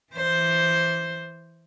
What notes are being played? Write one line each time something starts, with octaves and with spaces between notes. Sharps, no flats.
E3 C5